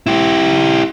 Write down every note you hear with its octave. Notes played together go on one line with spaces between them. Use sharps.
E4 G4